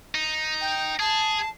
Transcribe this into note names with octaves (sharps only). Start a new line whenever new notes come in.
D#4
G5
G#4 A5